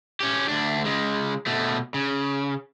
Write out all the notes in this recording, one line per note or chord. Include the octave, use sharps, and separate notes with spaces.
C#4 G4
D2 D4
C#3 G#3
B2 A3
C#3